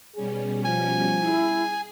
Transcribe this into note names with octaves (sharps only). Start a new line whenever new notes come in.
B2 G3 C#4 G#4
F3 G#5
E4 G#4